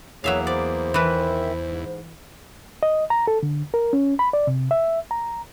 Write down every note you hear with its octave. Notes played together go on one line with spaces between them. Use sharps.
E2 F#3 A#3 B3 G#4 C#5 E5 F5
C5 D5
D#3 E3 B4 E5
G#2
D#5
A#5
A4
D3
A#4
C#4
B5
D5
C3
E5
A#5